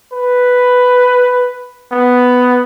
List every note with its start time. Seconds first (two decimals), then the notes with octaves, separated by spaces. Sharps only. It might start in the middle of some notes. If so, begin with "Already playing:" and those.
0.13 B4
1.92 B3